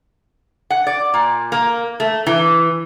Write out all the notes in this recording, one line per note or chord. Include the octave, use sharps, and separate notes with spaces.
F#5
D5
A#2
A#3
A3
E3